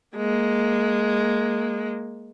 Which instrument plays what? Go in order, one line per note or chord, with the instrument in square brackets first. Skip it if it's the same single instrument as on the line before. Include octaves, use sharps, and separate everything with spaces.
[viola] G#3 A#3